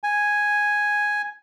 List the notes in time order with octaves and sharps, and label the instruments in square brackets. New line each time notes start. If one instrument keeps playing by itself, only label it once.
[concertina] G#5